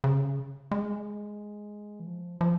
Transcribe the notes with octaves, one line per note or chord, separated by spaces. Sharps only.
C#3
G#3
E3
F3
F3